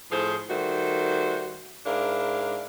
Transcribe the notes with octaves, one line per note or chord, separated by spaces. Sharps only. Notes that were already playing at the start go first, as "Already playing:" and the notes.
A2 F3 G#4 C5
D#3 G3 A3 F#4 C5
G#2 D4 E4 A#4 F5